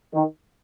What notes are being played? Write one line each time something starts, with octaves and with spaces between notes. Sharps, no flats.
D#3